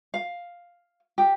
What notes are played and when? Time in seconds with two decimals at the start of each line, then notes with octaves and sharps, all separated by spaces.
0.14 F5
1.18 G4